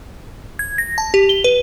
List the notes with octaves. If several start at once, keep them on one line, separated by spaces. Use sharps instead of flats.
G#6
A#6
A5
G4
G7
B4